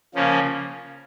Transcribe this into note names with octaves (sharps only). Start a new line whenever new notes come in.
C#3 F3 A#3 C#4